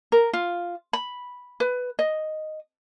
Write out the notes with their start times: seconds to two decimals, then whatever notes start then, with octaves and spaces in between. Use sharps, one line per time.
0.12 A#4
0.33 F4
0.93 B5
1.60 B4
1.99 D#5